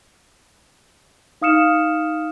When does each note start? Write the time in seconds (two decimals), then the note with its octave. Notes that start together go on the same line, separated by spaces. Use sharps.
1.42 D#4 F5 D#6 F6 C#7 E7